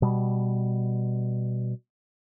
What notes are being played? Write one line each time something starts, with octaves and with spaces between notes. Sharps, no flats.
B2 G3